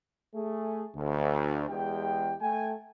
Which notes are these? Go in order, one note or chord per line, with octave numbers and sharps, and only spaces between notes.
A3 G#4
D2
E2 G#3 G4 G5
A3 G5 G#5